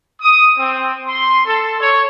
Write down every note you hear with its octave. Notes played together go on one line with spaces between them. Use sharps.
D#6
C4
C6
A4
C#5